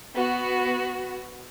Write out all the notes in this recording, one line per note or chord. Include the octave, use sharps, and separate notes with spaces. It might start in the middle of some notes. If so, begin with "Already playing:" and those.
B3 F#4